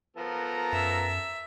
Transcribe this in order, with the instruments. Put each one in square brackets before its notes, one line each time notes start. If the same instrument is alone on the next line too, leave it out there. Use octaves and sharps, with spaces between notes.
[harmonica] F3 B3 [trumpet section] A4 A#4 A#5
[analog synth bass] F#2 [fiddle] E5